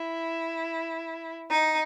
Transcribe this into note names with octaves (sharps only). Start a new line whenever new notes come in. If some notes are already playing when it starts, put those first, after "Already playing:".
Already playing: E4
D#4